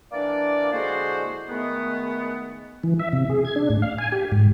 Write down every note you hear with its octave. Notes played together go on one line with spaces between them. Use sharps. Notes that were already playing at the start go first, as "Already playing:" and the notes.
E3 A#3 D4 D5
D3 G#3 A#3 E4 F#4 C5
D#3 G#3 A3 B3
E3
E5
C3
G#4
G#6
D4
A2
F5
G#5
G4
G#2